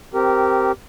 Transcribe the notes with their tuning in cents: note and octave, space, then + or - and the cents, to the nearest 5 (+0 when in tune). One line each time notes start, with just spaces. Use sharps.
C4 +0 G4 -15 A#4 -10